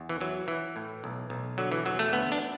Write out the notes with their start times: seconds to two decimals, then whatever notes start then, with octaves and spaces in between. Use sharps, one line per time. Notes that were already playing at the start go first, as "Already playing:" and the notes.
Already playing: E2
0.09 E3
0.21 E3 F#3
0.48 E3
0.76 A2
1.04 B1
1.30 B1
1.58 D3 F#3
1.72 E3
1.85 E2 F#3
1.99 A3
2.13 D2 B3
2.32 D4